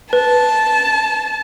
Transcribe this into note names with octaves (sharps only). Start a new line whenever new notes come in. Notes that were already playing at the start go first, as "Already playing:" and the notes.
B4 A5